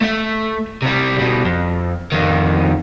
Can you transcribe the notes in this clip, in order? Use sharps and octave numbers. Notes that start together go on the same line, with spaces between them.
A3 E5
C3 G3
B2 G3
F2
F2 D#3